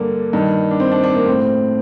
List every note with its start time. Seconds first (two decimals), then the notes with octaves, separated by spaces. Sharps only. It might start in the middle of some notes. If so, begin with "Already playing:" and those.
Already playing: G2 D3 A#3
0.33 G2 D#3
0.71 D4
0.80 C4
0.92 D4
1.04 D4
1.15 A#3
1.26 A2 C4